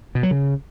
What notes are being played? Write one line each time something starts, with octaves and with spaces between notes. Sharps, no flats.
B2
F#3
C#3